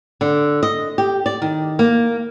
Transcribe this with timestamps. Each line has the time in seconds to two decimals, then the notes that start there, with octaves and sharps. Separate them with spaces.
0.21 D3
0.63 D#5
0.98 G4
1.26 D5
1.42 D#3
1.79 A#3